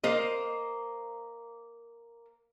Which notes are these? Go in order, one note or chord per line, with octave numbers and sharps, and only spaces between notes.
A#3 C5 D#5